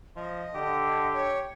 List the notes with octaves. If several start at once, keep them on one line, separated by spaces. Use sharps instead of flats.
F3 D#5
D3 G4
C#5